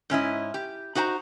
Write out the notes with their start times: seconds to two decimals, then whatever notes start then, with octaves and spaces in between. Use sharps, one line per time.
0.10 G#2 C#4 E4 D#5
0.54 G4
0.95 D#4 F#4 C5 G5 A#5